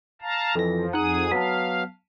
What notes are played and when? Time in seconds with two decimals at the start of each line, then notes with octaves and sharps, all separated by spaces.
0.22 F5 A5 A#5
0.55 F2 E3 F3 A4 A#6
0.93 F2 D#4 G#4 F#5 A#5 D#6 F#6
1.31 F#3 B3 F5 A5 B6